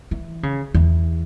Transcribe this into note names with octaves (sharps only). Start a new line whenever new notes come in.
E3
C#3
E2